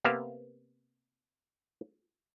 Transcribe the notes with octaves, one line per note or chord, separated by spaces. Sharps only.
C3 A#3 B3 G4 E5 F5